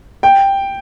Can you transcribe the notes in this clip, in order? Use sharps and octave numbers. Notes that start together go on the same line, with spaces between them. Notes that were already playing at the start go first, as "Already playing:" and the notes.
G5